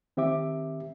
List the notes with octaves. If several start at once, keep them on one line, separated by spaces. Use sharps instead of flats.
D#3 C4 G4 E5 D6